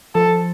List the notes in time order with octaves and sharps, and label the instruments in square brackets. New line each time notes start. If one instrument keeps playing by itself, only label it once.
[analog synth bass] F3 [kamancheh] A4